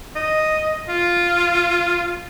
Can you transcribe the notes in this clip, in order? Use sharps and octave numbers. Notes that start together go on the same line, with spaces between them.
D#5
F4